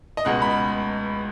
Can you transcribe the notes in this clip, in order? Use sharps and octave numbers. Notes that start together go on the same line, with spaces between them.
D#5
C#2 B2 G#3 F#5
B5